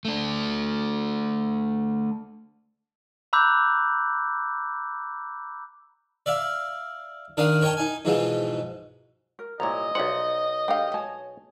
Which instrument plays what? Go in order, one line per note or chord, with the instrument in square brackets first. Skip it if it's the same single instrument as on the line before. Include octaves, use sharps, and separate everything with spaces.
[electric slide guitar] A3 D4
[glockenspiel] A#5 B5 D6 E6 F#6 G6
[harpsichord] D5 E5 F5
D#3 D4 A#4 D5 F5 D#6
A#4 C#5 D#5 G5 A5
D#4 G#5
G#2 B2 E3 F3 G#3
[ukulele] A#4
[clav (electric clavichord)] C2 A#2 [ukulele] E4 C#5 A#5 [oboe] D#5
[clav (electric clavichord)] B1 F#5 [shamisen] G3 C5 [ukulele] D#4 D5 E5
[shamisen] D4 F5 [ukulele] G4 A4 G5
[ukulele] C#5 G#5 A5